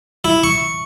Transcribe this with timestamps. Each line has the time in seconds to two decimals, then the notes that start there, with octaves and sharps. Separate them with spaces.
0.25 E4
0.44 C#6